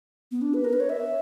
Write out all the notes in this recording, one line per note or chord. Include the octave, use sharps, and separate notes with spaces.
B3
D4
B4
A#4
B4
C#5
E5